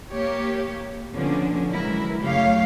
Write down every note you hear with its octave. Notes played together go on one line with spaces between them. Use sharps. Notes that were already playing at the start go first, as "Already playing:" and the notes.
A#3 G4 C#5
B2 D3 F3 A#3 C#4 D4
E3 F#3 G#3 E4 A#4
F#2 C#3 A3 G4 C#5 F5